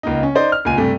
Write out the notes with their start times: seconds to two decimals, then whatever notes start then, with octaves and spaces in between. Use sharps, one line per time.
0.03 C#2 A#3 D#4
0.23 C#4
0.35 D#4 C5 D5
0.52 F6
0.65 C#2 A#2 G#5 D#7
0.77 G2 C3 A3